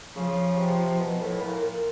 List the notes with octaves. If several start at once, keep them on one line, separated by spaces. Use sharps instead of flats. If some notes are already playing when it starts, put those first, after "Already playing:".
C#3 F3
C3
B2
A2
A#2
A#2